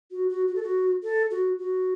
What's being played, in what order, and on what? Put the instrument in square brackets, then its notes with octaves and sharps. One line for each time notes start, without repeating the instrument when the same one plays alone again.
[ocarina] F#4
F#4
F#4
A4
F#4
A4
F#4
F#4